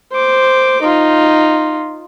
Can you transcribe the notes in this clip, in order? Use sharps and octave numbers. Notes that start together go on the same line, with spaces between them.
C5 D6
D#4 F4